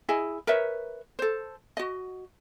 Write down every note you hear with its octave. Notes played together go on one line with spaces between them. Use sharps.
E4 G#4 D#5 G#5
A#4 B4 C#5 E5
A4 C5
F#4 D#5